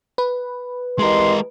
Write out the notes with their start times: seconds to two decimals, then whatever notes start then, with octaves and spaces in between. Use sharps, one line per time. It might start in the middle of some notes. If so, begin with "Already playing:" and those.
0.18 B4
0.99 E3 G#3 G4 A#4 D#5 C6